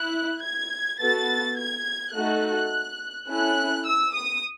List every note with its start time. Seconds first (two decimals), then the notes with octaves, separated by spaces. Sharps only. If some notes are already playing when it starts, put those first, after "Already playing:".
Already playing: E4 F#6
0.42 G#6
1.00 B3 F#4 A4 A6
1.57 G#6
2.14 A3 D#4 F#4 A4 F#6
3.28 C#4 E4 A4 F#6
3.86 E6
4.15 D#6